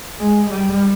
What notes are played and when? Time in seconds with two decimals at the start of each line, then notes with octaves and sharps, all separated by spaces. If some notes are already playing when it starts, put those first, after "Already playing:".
0.19 G#3
0.50 G3